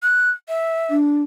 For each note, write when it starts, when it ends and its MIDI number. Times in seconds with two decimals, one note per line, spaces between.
0.03 0.30 90
0.48 0.95 76
0.90 1.22 62